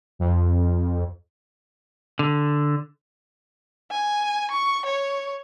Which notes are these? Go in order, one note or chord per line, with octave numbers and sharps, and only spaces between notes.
F2
D3
G#5
C#6
C#5